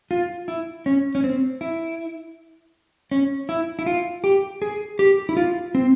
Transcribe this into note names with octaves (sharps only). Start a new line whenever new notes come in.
F4
E4
C#4
C#4
C4
E4
C#4
E4
E4
F4
G4
G#4
G4
E4
F4
C4